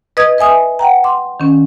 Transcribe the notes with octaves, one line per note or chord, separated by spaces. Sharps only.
B4 D#5 D#6 G#6
B4 E5 G#5 D#6
F#5 G5 A#5
C6 D6
D#3 C#4